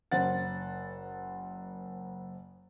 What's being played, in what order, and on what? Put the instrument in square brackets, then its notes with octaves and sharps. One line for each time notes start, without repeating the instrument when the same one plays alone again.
[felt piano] F#1 C5 F#5 A6